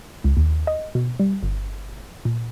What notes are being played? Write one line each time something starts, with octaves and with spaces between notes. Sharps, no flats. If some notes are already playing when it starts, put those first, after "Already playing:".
C#2
D#2
D#5
B2
G3
G1
A#2